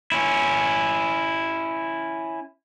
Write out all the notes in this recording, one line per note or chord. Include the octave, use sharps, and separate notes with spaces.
C#4 E4